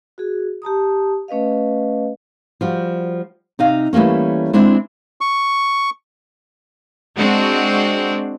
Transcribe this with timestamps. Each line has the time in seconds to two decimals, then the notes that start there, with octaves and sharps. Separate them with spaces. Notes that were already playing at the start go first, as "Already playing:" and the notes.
0.18 F#4 G#4
0.62 G4 A5 A#5 D#6
1.28 A3 C#4 B4 D#5 F5
2.61 F3 G3 F#4
3.59 C3 D#4 F5
3.93 E3 G3 A3 A#3 C#4
4.53 G#3 C4 D4 E4 C5
5.21 C#6
7.15 G#3 C4 D4 F#4